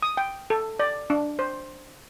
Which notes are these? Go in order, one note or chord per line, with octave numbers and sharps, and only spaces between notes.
D#6
G5
A4
D5
D4
C5